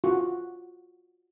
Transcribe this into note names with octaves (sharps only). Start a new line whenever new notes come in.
F4 F#4